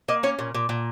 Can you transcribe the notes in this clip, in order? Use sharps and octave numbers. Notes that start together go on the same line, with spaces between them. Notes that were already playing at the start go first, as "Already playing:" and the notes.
A#3 D#5
C#4 C#5
A#2
A#2
A#2